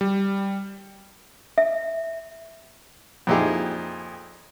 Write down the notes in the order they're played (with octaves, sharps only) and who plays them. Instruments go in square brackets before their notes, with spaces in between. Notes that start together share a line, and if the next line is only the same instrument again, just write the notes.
[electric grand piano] G3
[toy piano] E5
[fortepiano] F2 A#2 D#4 E4 G4 G#4